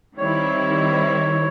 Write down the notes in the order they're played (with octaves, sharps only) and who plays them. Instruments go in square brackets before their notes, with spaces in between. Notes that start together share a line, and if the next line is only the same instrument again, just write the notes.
[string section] D#3 G3 C4 E4 [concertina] C#5